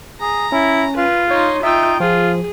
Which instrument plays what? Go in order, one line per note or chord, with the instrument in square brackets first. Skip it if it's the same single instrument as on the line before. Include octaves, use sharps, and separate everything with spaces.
[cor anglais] G#4 [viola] A#5
[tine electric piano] C#4 [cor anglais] E4
[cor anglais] F4 [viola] B4
[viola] D#4 C6 [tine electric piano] C#5
[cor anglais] D#4 [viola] F4 G5 [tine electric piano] E5 E6
[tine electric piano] F3 [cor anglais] F4 [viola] G#4